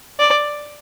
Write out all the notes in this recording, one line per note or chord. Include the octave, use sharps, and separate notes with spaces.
D5